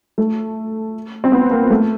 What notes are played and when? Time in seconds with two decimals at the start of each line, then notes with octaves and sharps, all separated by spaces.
0.18 A3
1.24 C4
1.32 B3
1.51 A#3
1.70 A3